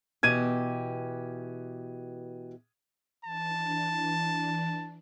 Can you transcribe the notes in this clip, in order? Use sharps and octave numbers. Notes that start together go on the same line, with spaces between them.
B2 E3 G4 G#6 D#7
E3 D4 A5